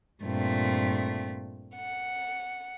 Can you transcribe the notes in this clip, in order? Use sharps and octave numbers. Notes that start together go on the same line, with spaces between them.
G2 A#2 A3 C4
F#5